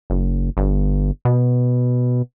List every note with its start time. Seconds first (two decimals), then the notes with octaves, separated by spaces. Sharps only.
0.10 F#1
0.57 G1
1.25 B2